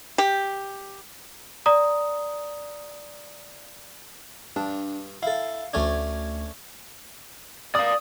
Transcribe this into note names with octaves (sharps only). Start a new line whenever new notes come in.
G4
D5 A#5 D#6
G2 D4
E4 A4 F5
D2 A3 C#4 D4 G#6
D5 F5 D#6